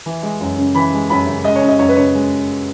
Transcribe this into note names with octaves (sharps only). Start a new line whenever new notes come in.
E3
G#3
F#2
C#3
E3 B5
G#3
F#2 B5
C#3
G#3 D#5
C#5
C#4
D#5
F#2 C#5
B4
C#3 C#5
G#3